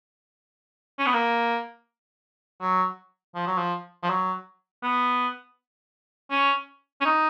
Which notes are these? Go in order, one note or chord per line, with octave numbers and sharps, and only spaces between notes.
C#4
B3
A#3
F#3
F3
F#3
F3
F3
F#3
B3
C#4
C#4
D#4